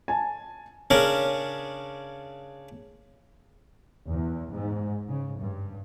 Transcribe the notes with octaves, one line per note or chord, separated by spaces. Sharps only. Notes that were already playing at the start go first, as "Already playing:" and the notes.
G#5 A5
C#3 C#4 D4 A#4
E2
G#2
C#3
G2